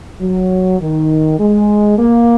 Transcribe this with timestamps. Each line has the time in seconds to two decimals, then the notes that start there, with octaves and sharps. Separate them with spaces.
0.20 F#3
0.80 D#3
1.39 G#3
1.98 A#3